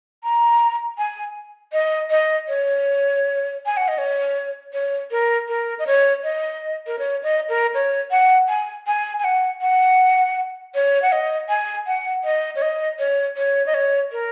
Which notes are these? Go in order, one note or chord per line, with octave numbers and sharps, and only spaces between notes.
A#5
G#5
D#5
D#5
C#5
G#5
F#5
D#5
C#5
C#5
A#4
A#4
D#5
C#5
D#5
A#4
C#5
D#5
A#4
C#5
F#5
G#5
G#5
G#5
F#5
F#5
C#5
F#5
D#5
G#5
F#5
D#5
C#5
D#5
C#5
C#5
D#5
C#5
A#4